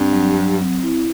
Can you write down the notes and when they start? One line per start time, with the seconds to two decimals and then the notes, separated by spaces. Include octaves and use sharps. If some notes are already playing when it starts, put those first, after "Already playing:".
Already playing: G2 C4
0.13 F#3
0.37 F#3
0.60 C4
0.83 E4